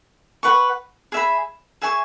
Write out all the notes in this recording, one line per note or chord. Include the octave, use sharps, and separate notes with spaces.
B4 F#5 C#6
G#4 E5 G#5 B5
G#4 E5 G#5 C#6